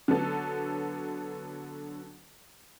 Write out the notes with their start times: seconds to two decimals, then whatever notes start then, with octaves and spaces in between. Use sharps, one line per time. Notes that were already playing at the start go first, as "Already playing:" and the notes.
0.08 D3 F#3 B3 A4